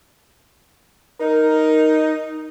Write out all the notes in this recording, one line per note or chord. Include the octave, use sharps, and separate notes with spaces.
D#4 A#4